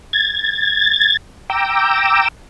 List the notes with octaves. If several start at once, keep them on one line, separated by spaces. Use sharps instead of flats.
G#6 A6
G5 A#5 D6 E6